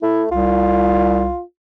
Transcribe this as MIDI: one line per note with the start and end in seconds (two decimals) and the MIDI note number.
0.02 0.30 57
0.02 0.23 64
0.31 1.32 36
0.31 1.42 65